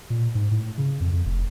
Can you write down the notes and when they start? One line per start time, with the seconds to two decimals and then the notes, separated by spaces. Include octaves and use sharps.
0.10 A#2
0.35 G#2
0.51 A2
0.78 C#3
1.00 F2
1.13 F2
1.26 F1